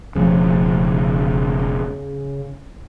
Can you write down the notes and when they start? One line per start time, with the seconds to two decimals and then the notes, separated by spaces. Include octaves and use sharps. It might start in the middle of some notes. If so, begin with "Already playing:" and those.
0.15 E1 C#3 F3 A3